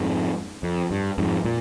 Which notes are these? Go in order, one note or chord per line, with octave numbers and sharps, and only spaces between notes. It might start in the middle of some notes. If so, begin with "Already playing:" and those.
Already playing: F2 G#2
F2
G2
F2 G#2
A#2